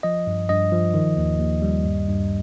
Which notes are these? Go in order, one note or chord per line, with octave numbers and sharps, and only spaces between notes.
F3 D#5
G2
G2 D#5
F3
D#3
D#2
D#2
G3
G2
G2